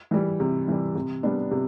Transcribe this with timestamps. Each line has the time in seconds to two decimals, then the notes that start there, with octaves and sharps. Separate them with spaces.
0.11 E3 G3
0.40 C3
0.68 E3 G3
0.95 C3
1.23 G3 B3 D4
1.51 C3